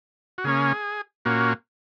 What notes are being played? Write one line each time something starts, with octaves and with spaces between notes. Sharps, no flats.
F#4
C#3 A#3 C#4 G#4
A#2 A#3 C#4 F#4